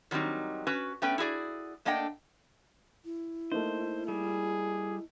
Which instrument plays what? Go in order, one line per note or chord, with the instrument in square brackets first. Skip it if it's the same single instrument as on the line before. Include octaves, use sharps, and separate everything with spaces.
[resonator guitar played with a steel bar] D#3 F#3 G3 C4 D#4
C#4 F#4 B4
A3 B3 C#4 B4 G5
E4 F#4 G#4 D5
A3 A#3 D4 D#5 F#5 G5
[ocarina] E4
[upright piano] A3 A#3 D#4 [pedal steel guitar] C5
[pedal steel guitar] G3 [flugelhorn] G#4